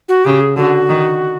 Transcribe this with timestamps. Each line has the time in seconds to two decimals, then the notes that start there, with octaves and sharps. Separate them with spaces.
0.09 F#4
0.25 C#3 G4
0.41 G#4
0.56 D3 F#4
0.89 D#3